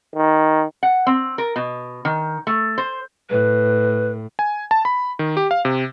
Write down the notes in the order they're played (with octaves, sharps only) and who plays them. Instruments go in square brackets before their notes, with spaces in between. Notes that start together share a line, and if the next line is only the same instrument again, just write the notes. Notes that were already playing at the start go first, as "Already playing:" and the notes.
[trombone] D#3
[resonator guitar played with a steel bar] F#5
C4
A#4
B2
D#3
A3
C5
[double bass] A2 [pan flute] B4
[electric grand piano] G#5
A5
B5
D#3
G4
F5
C3